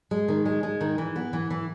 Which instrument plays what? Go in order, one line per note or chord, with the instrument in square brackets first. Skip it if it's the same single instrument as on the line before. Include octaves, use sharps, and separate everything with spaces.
[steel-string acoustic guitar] G#3
D#3
G#3
G#3
D#3
E3
B3
E3
E3